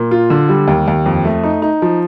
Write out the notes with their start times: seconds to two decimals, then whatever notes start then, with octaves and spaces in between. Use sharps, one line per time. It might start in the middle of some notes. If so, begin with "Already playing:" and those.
Already playing: A#2
0.11 F4
0.30 D3
0.49 G3
0.68 D#2
0.88 D#2
1.06 F2
1.25 A3
1.43 D#4
1.62 D#4
1.82 F3